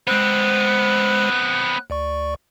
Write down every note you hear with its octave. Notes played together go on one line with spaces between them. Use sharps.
G#3 B3 C4 C5 F#6
D2 D5 C#6